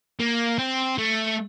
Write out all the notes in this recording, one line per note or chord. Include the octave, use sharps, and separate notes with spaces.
A#3
C4
A3